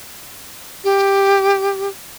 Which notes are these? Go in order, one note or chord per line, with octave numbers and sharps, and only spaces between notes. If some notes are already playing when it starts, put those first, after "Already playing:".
G4